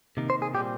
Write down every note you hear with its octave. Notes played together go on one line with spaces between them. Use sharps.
C3 D#3 A#3
C5
G#4
A#2 G3 C4 G4